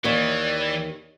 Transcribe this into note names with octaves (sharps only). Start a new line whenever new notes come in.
D#2 E3 C#5 D5